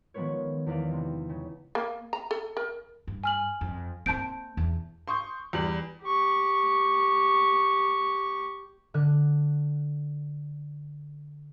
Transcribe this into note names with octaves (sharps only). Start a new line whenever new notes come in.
D#3 F3 G#3 B3 B4 C#5
E2 D#4 B4 D5 F5
C3 C4
C#3
A#3
A#5
A4
A#4
G2
G#5 F6 F#7
F2
A#3 C4 A5 G6 D7
E2
C6 C#6 D#6 G6
E2 G3 F#7
G4 C#6
D3 F#6